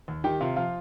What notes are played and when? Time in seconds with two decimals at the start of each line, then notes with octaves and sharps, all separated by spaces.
0.08 D#2
0.24 D#3 G4 G5
0.41 C3 F4 F5
0.56 F3 F4 F5